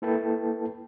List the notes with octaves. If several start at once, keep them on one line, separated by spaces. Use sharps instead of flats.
A#3 E4 A4 B4 G5 A5